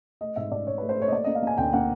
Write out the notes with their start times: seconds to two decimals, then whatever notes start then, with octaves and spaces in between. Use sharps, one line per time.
0.21 A3 D#5
0.36 G#2 E5
0.51 G#2 D5
0.67 G#2 C#5
0.78 A3 B4
0.89 C5
0.97 A3 C#5
1.08 D#5
1.12 A#3 D5
1.24 A#3 D#5
1.35 F5
1.43 A#3 G#5
1.58 D2 G5
1.73 A#3 F#5